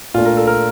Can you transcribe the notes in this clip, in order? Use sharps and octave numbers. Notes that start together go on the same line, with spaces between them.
A#2 A3 D4 F4
A#4
A4
A#4